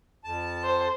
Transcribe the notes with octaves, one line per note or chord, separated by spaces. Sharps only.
F2 A5
C5